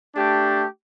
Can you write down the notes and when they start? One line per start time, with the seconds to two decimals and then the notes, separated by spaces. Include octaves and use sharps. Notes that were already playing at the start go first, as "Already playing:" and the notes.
0.16 A3 D4 G4